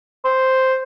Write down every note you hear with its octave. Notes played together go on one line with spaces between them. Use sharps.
C5